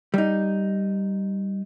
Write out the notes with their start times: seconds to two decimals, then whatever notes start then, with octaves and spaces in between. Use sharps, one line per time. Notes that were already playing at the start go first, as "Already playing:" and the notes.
0.14 G3 D#4